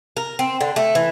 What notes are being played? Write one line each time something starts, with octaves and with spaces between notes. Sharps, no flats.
A#4
C4
D3
A3
E3